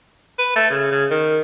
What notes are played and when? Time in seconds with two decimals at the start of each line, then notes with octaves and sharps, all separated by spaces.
0.39 B4
0.56 A3
0.71 C#3
0.91 C#3
1.11 D#3